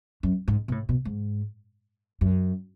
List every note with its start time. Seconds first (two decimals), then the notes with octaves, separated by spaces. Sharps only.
0.23 F#2
0.48 G#2
0.68 B2
0.72 A2
0.89 B2
1.05 G#2
2.21 F#2